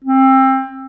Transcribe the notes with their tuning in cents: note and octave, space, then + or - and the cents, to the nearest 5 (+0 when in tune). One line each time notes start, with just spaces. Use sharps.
C4 +25